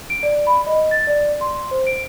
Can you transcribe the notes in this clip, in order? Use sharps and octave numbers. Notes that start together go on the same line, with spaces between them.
D7
D5
B5
D#5
A6
D5
C6
C5
D7